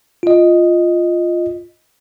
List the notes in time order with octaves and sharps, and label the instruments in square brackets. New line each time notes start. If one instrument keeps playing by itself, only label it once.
[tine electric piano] F4 D#5